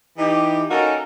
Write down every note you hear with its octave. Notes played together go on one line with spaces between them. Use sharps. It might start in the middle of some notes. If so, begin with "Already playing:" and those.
E3 D#4 G4
A#3 C#4 D#4 F#4 A4 A#4